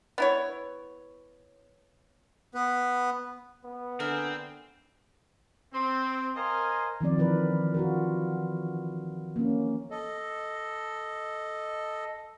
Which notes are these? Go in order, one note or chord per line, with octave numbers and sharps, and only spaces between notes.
B3 E4 C#5
B3 B4
B3
D3 C4 A#4 E5 G#5
C4
A#4 C5 D#5 F5 G#5
D#3 F3 C4 D5
E3 A#4 B4
F4 F#4 A#4
A#3 C#4
A4 D#5